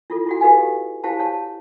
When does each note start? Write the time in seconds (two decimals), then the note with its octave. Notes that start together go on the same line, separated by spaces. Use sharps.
0.10 E4 F4 A4
0.26 E4 F#4 F#5
0.41 G4 A4 B4 D#5 F5 G#5
1.04 E4 G4 C5 F5 A5
1.19 C#5 A5